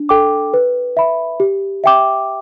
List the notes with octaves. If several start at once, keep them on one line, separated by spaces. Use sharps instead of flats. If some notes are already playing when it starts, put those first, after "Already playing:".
Already playing: D4
A4 G5 D6
B4
E5 B5
G4
E5 G5 D6